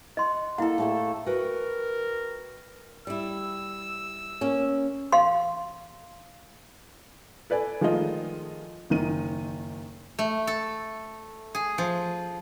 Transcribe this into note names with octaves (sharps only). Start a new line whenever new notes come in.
D#5 F#5 C6
A#3 E4 A4 F#5
A2 A3 A4
F#4 A#4 B4 G5
G3 E4 E6
A#3 C#4
F5 C6
A4 B4 D5 G#5
D#3 F3 G#3 A3 F4 D#5
F#1 D#3 D#7
A3
A4
G#4
F3